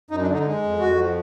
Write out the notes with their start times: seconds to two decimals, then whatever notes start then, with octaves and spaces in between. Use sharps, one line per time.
0.11 F#2 D#4
0.22 D4
0.28 D3
0.34 D#4
0.45 G#3
0.62 F2
0.80 F2 F#4
0.97 F3